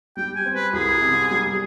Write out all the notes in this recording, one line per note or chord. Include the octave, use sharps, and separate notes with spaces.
G3 G5
G#5
C4
B4
C2 G#4
C3
G3